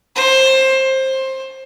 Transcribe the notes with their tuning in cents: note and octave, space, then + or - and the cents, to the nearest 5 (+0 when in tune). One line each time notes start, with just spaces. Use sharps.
C5 +20
C5 +20